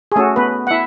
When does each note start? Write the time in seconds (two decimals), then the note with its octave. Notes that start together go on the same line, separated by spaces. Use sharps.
0.12 G#4
0.16 A3 C#4 F#4 A4
0.36 B3 B4
0.67 F#5
0.71 E4 E5